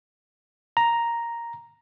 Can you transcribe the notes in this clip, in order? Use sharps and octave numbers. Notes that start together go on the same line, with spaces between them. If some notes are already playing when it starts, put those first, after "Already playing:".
A#5